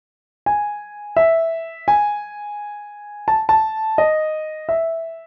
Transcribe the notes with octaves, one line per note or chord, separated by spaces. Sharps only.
G#5
E5
G#5
A5
A5
D#5
E5